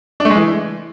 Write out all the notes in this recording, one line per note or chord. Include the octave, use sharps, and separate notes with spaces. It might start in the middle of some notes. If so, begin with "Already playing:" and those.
D4
A3
G#3
E3